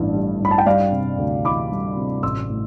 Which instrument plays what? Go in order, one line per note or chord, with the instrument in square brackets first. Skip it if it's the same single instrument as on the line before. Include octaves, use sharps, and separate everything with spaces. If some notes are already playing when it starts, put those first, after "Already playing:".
Already playing: [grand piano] A1 G2 E3
G3
G2 B5
A5
G5
G3 D5 F5
C3
D2
E3 B5 D6
G3
C3
A1 C6 E6
A2